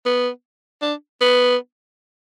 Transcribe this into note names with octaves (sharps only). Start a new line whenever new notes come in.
B3
D4
B3